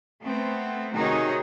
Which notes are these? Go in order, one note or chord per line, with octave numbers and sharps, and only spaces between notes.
A3 B3 C4
C3 D#3 D#4 F#4 G#4 C#5